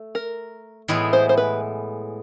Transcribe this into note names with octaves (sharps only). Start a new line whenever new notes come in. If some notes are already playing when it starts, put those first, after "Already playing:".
Already playing: A3
A#4
A2 E3 G#3 B3 E4
C5
C5
B4